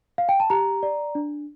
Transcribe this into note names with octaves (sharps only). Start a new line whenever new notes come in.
F5
G5
A5
G4 A#5
D5
D4